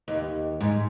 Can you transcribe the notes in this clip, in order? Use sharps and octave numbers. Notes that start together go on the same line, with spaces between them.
D#2
G#2